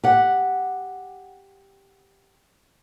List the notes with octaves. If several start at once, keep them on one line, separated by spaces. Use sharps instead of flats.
G4 F#5